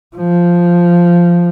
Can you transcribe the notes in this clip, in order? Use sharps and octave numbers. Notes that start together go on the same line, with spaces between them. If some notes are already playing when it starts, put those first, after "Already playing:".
F3